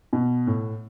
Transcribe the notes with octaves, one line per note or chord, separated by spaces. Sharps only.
B2
A2